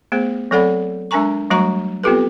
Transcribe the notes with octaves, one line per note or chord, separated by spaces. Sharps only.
A3 B3 G#4 C5
F#3 C4 A4 D5 F#5 B5
G#3 D4 A#4 G#5 A#5 C#6
F#3 G3 A3 F#4 A#5 C#6
B3 C4 F4 G4 A4 B4